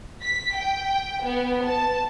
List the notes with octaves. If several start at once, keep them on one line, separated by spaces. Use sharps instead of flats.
B6
G5
B3
A5